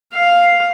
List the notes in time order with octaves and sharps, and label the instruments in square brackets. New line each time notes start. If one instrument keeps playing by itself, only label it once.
[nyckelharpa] F5